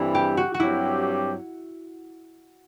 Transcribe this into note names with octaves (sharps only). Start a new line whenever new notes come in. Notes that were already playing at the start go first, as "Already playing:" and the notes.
Already playing: G2 E3 G3 C4 E4 A4
G4
F#4
F#4
G2 F#3 C4 E4 G4